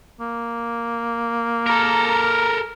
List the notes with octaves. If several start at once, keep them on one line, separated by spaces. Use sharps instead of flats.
A#3
A4 A#4 A#5